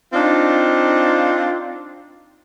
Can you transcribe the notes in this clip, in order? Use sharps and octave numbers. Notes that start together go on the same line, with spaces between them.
C4 D4 D#4 F4